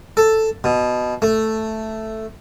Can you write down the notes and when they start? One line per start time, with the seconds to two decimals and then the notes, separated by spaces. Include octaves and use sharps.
0.17 A4
0.64 B2
1.22 A3